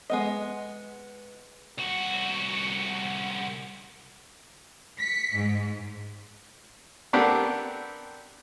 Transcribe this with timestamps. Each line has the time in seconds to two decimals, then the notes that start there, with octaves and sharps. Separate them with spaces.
0.10 G#3 B3 D#5
1.78 C2 F#4
4.99 B6 C#7
5.35 G#2
7.13 B3 C4 D4 G4 A4 A#4